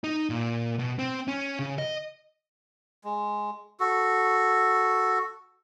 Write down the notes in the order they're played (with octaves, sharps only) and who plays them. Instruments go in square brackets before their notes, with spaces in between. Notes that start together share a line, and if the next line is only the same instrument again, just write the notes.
[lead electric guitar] D#4
A#2
B2
C4
C#4
C#3
D#5
[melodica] G#3
F#4 A4